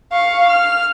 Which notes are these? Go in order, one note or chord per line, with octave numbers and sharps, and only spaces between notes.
F5 C#6
F6